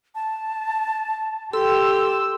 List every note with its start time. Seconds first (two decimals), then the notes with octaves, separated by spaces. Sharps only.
0.15 A5
1.53 G4 A4 C6 E6